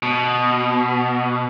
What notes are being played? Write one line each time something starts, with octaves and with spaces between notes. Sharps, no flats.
B2